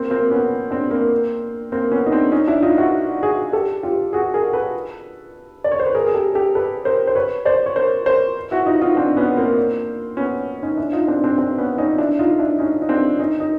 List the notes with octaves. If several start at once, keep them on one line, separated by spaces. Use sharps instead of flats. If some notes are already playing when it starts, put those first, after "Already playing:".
Already playing: A#3 C4
A#3 C4
B3 C#4
C4 D4
A#3 C4
A#3 C4
B3 C#4
D#4
C4 D4
C#4 D#4
D4 E4
D#4 F4
E4 F#4
F#4 G#4
G4 A4
F4 G4
F#4 G#4
G#4 A#4
A4 B4
D5
C#5
C5
B4
G#4 A#4
G#4
G4 A4
G4 A4
A4 B4
A#4 C5
C5
B4 C#5
C5 D5
C#5
A#4 C5
A#4 C5
E4 F#4
D#4 F4
D#4 F4
C4 D4
B3 C#4
A#3 C4
B3 C#4
C#4 D#4
D4 E4
D#4 F4
C4 D4
C4 D4
C4 D4
B3 C#4
C#4 D#4
D4 E4
D#4 F4
D4 E4
C#4 D#4
D#4
C4 D4
C#4 D#4
D#4